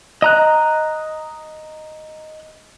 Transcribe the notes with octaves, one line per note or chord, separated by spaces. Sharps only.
D#5 A#5 F#6